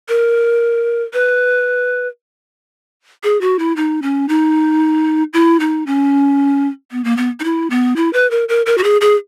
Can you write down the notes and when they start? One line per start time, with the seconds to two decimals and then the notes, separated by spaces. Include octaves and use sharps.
0.09 A#4
1.13 B4
3.24 G#4
3.41 F#4
3.59 E4
3.76 D#4
4.02 C#4
4.29 D#4
5.33 E4
5.60 D#4
5.87 C#4
6.91 B3
7.04 A#3
7.17 B3
7.40 D#4
7.44 E4
7.70 B3
7.96 E4
8.13 B4
8.31 A#4
8.49 A#4
8.66 A#4
8.78 F#4
8.84 G#4
9.01 G#4